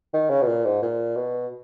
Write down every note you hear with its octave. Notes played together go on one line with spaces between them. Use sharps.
D#3
C#3
B2
A#2
G#2
A#2
B2